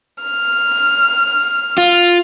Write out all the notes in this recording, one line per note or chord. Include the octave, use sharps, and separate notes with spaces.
F6
F4